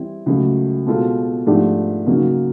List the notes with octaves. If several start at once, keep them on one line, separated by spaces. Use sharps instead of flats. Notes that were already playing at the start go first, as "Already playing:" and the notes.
Already playing: E3 G3 C4 E4
C#2 C#3 F#3 A3
B2 G#3 C4 F4 A4
G#2 F3 A3 D4 G4
C#3 F#3 A#3 D#4